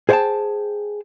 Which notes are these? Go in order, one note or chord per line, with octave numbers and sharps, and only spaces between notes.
G#4 C5 D5 F#5 G5 A5